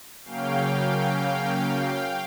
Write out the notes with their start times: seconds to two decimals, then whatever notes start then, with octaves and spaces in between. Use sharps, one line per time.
0.24 C#3 F#3 A#3 C#4 F5 G5